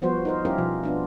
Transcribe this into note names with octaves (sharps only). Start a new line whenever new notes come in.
F3 G3 B3 F#4 C5
D#4 A#4 C5
G3 C#4 E4 F4 G4 A#4
B2 F3
B3 D4 F4